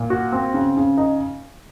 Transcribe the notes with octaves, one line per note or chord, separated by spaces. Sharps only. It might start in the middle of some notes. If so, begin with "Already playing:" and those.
Already playing: A#2
F#4
C4
C#3
C#3
D#4